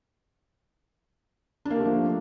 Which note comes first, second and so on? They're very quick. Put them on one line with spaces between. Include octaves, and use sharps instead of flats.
D4 A#3 G4 A3 F3